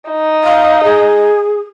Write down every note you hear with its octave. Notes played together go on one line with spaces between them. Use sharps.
D#4
F5
G#4